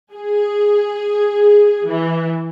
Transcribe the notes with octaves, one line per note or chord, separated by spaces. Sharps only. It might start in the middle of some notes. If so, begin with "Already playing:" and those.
G#4
E3